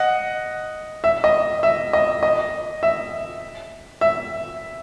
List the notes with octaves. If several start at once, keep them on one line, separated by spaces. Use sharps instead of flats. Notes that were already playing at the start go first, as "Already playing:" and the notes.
Already playing: D#5 F#5
E5
D#5
E5
D#5
D#5
E5
E5